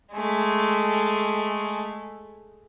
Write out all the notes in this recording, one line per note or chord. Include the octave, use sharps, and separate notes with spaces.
G#3 A3